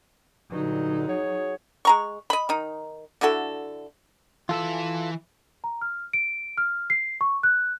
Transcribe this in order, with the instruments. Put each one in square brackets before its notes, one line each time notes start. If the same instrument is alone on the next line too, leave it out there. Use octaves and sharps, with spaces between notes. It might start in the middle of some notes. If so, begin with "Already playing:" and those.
[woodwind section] G2 A#2 D3 [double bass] F#3 D#4
[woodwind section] F#4 G#4 C#5
[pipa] G#3 A#5 C#6
D#5 B5
D#3 D#4
D3 E4 F#4 A4
[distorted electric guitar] E3 E5 [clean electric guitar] F4 A4
[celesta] A#5
F6
D7
F6
C7
C#6
F#6